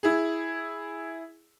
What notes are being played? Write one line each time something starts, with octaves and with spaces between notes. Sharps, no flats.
E4 G#4